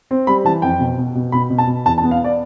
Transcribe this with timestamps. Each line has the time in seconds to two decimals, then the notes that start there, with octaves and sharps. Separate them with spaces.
0.11 C4
0.27 G3 B5
0.45 E3 A5
0.62 F2 G5
0.80 B2
0.98 B2
1.15 B2
1.32 B2 B5
1.50 B2
1.58 A5
1.67 B2
1.86 E2 A5
1.98 A5
2.03 B3
2.11 F5
2.24 D5